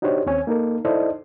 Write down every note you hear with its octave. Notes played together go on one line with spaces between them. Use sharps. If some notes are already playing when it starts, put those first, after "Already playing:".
D4 D#4 F#4 G4 C5 C#5
D#2 C4 C#4 C#5 G#5
A#3 D#4 A4 A#4
D#4 E4 A4 C5 D5 D#5